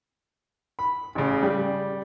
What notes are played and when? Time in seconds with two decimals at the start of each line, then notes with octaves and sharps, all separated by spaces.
0.79 B5
1.15 A1 C#3
1.43 G3